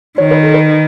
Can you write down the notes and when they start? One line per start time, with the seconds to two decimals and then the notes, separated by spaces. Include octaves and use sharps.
0.18 D#3 C#5
0.31 B4
0.43 A4
0.54 B4